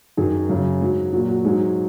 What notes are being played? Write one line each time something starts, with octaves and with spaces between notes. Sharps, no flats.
F#2 D#3 F#3 G#4
F#2 C#3 F#3
G#2 F#3
A#2 F#3
F#4
G#2 F#3 G#4